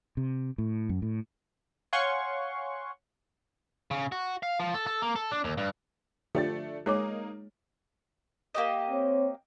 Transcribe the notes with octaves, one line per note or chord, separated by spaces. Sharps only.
C3
A2
F#2
A2
C#5 F5 F#5 G#5 C6 C#6
C#3
F#4
F5
F3
A4
A4
A#3
A4
D4
D#2
G2
D3 F3 A3 D4 G4 A6
G#3 A#3 D#4 G#4 C#5 D6
A#3 G4 D#5
C4 C#5